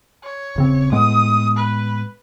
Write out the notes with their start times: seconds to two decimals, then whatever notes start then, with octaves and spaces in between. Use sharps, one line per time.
0.23 C#5
0.56 D#1 C#3 C4
0.92 A2 G#3 B3 D#6
1.56 B4